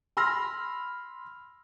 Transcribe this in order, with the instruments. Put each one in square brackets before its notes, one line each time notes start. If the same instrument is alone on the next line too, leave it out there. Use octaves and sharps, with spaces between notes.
[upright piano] B5 C6 E6 F6 A#6